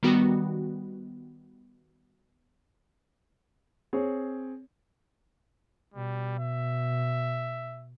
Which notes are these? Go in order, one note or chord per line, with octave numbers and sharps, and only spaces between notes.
D#3 G3 B3 F#4
C4 G#4 C#5
B2 G3
E5